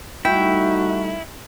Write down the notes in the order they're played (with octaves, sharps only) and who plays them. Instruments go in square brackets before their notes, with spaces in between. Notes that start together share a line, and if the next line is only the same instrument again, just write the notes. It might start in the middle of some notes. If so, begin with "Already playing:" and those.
[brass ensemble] G3 A3 D#4 [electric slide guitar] E4 [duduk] F#4 [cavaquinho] G5